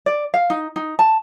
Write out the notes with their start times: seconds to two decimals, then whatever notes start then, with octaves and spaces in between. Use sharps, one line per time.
0.06 D5
0.34 F5
0.50 D#4
0.76 D#4
0.99 A5